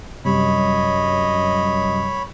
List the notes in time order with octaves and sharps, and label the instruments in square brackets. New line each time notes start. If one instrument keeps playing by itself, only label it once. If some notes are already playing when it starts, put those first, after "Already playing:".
[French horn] F#2 [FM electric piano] C3 G3 [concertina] C#5 B5 [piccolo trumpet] D#5